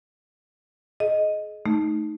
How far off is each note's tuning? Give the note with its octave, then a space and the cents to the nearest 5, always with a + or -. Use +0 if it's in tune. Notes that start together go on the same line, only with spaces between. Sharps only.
G#4 +35 D#5 +0
A3 +0 D#4 +0